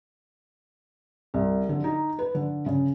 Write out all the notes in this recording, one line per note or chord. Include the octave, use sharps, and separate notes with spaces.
C2
D3
D#4
B4
D3
C#3